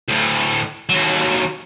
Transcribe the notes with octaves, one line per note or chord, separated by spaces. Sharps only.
D2 A2
D#2 F#3